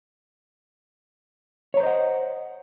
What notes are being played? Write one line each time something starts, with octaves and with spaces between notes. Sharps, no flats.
C5 C#5 D#5 F#5 A#5